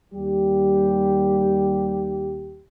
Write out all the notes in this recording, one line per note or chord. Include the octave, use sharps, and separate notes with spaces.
D#2 G3 G4